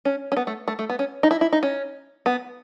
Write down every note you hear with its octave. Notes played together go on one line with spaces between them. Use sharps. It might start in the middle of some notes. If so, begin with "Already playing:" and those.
C#4
C#4
B3
A3
A3
A3
B3
C#4
D#4
E4
E4
D#4
C#4
B3